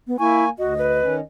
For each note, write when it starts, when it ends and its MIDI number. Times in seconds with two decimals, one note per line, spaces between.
0.07 0.17 59
0.19 0.49 58
0.19 0.44 64
0.19 0.49 80
0.19 0.49 85
0.58 1.01 38
0.58 0.74 66
0.58 1.23 75
0.78 1.14 71
1.02 1.20 51
1.02 1.20 61